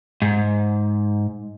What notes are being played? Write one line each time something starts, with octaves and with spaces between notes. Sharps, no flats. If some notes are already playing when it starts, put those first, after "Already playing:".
G#2